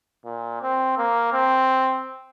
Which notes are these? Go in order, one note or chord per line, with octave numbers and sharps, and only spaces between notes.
A#2
C4
A#3
C4